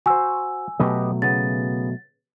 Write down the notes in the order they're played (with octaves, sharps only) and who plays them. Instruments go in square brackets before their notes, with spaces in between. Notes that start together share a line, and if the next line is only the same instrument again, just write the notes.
[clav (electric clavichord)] F#4 C5 [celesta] G#5 E6
[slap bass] B2 F#3 A3 [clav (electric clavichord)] G4 B4 D#5
[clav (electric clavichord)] C#3 B3 [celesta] A6